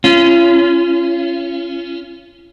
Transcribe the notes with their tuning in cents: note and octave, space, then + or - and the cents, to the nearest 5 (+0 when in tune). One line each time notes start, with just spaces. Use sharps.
C#4 +0 F4 -35